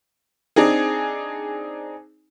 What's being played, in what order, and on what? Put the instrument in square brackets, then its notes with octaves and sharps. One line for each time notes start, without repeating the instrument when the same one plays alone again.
[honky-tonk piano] C4 D4 D#4 G#4